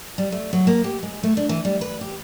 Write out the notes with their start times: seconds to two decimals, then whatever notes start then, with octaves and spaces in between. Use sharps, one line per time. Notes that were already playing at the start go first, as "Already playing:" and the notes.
0.18 G3
0.32 A3
0.53 F#3
0.67 A#3
0.84 G4
1.03 G#3
1.23 A3
1.37 D4
1.49 E3
1.65 G3
1.81 B4
2.01 G4